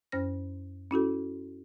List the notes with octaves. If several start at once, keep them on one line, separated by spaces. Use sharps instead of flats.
F#2 C#4 C5 F6 A#6
C#4 E4 F#4 A4